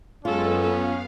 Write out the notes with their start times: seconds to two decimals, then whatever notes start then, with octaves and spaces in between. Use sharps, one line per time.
0.25 F#2 G#3 B3 C#4 F4 A4
0.67 B3 F5